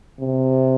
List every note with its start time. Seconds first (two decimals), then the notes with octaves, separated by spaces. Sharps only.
0.20 C3